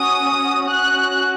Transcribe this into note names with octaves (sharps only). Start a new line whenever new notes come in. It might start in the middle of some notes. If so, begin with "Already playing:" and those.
Already playing: C#4 F#4 D#6
C#4 F#4 F#6